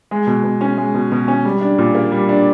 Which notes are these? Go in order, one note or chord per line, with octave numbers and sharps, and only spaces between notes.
G#3
B2
B2
C#4
G#3
B2
B2
C#4
G3
D4
A#2
A#3
G3
D4